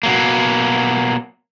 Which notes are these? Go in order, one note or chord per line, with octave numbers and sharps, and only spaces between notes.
B2 F#3 A#3